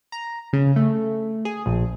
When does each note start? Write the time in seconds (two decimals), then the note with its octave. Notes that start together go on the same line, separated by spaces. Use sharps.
0.12 A#5
0.53 C#3
0.76 A3
1.45 G#4
1.66 A#1